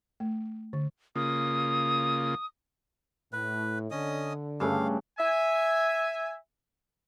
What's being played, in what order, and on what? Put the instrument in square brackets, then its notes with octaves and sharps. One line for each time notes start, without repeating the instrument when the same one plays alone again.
[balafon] A3
D3
[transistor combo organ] C#3 A#3 F4 [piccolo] D#6
[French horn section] A2 [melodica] B4
[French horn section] D3 [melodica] C#4 D#5 D#6
[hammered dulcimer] G2 C#3 A3 [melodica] F5
[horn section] E5 G#5